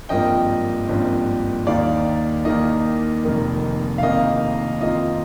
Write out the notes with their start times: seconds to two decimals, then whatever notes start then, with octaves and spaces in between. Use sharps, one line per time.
0.09 G#1 G2 F3 A#3 D#5 G5
0.89 G#1 G2 F3 A#3
1.67 D#2 D#3 A#3 D#4 D5 F5
2.45 D#2 D#3 A#3 D#4 D#5
3.24 F1 F2 D#3 A#3
3.98 F5
4.02 F1 F2 D#3 A#3 D#5
4.81 F2 D#3 A#3 F4 D#5